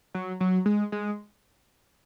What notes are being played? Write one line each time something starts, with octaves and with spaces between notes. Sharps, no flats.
F#3
F#3
G#3
G#3